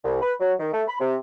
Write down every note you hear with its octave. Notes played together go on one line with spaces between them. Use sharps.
C2
B4
F#3
D#3
A3
B5
C3